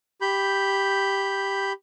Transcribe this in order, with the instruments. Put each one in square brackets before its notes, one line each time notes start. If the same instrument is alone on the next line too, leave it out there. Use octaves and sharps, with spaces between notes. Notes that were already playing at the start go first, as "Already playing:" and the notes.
[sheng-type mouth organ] G4 B5 G6